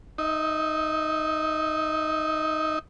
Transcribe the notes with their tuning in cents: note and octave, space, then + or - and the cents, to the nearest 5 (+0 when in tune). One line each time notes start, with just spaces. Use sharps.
D#4 +0 E5 -30